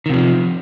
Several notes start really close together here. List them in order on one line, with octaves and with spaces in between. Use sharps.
D#3 C3 F3